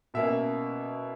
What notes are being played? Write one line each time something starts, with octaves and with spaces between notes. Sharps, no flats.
B2 A#3 C#4 E5